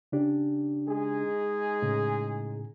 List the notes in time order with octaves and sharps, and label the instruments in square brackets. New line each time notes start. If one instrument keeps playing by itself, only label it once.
[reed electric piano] C#3 D4 G4
[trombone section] G#3 D#4 G#4
[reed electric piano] A2 C#3